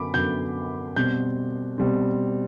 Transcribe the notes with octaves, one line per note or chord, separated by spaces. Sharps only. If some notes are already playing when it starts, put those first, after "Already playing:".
Already playing: F#2 D3 F#3 B3 B5 D6
F#2 D3 F#3 B3 G6
B2 G3 C4 G6
B2 G3 C4